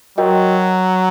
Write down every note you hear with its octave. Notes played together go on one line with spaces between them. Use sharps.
F#3 F#4 A#4 D#5 G5